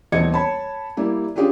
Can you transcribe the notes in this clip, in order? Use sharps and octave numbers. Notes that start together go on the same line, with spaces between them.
D#1 E2 C4 D#5 G#6 C#7
C#5 A5 B5
G3 A#3 E4
C#4 D4 F4 G4 G#4